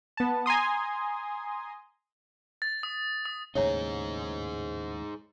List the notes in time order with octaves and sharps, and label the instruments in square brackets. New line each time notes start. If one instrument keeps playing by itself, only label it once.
[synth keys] B3 A5
G#5 A#5 C6 D#6
[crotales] A6
D#6
D#6
[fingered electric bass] D#2 A2 C#3 [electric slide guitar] D#4 G#4 [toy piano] C#5 E5 A#5